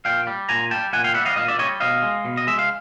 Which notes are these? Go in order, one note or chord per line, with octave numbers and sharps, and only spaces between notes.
A#2 F5 G5
G3
A#2 G#5 A#5
G3 G5 A5
A#2 F#5 G#5
F5 G5
G3 E5 F#5
D#5 F5
A#2 D#5 F5
D5 E5
G3 C#5 D#5
B2 D#5 F5
G#3
B2
D#5
G#3 E5
F5